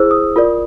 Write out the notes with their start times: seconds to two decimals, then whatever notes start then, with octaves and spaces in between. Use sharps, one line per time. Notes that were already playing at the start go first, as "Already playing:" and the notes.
Already playing: E4 G#4 C5 E6
0.11 D#6
0.36 F4 A#4 D5